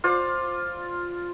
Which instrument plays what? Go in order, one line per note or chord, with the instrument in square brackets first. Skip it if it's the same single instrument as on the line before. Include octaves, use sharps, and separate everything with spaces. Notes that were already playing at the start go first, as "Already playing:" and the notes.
[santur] F4 C5 D5